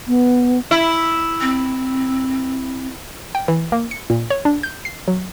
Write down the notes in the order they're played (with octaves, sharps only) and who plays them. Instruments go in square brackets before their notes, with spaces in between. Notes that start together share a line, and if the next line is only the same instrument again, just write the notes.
[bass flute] B3
[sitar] E4
[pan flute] C4
[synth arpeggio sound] G5
E3
A#3
C#7
A#2
C#5
D4
G6
C7
F#3